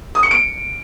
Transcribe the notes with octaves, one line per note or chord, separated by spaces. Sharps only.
D#6
C#7
D7